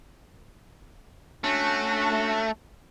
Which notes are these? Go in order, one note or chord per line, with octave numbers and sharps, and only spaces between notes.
A3 C#4 D4 F#4